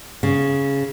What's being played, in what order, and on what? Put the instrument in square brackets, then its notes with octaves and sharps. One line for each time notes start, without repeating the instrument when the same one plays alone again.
[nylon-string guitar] C#3